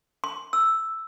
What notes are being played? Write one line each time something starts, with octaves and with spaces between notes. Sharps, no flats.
C6
E6